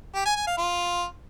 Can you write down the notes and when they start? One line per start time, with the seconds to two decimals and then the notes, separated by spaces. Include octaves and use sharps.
0.15 G4
0.25 G#5
0.36 G#5
0.47 F5
0.58 F4